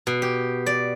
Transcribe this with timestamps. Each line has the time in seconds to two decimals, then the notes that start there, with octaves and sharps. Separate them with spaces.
0.07 B2
0.22 G4
0.66 D5